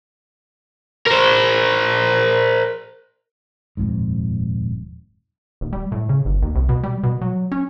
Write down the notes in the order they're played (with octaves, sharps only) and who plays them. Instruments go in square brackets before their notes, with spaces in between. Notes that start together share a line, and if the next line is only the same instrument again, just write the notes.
[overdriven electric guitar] A#4 C5
[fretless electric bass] D#1 F2 G#2
[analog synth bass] D#1
G3
A2
C#3
G1
D#2
C2
B2
G3
B2
F#3
C#4